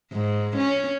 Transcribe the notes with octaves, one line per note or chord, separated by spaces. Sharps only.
G#2
C#4